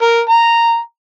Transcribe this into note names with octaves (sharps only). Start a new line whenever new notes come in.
A#4
A#5